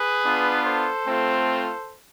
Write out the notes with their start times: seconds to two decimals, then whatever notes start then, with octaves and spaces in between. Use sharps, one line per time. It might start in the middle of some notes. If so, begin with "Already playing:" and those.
Already playing: G#4 B4
0.24 B3 D4 F4
0.65 A4 C5
1.07 A3 C4 F4